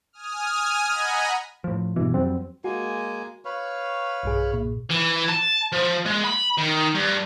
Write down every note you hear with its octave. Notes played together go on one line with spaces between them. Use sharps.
G#5 D#6 F6
D#5 F#5 G#5 A#5 B5
A2 F3
G2 B2 E3
F2 F#3 G3 C4
G#3 A#3 F#4 G#5
B4 C#5 F5
B1 G2 G#4
A#2
E3
A5
F3
G#3
B5
D#3
G2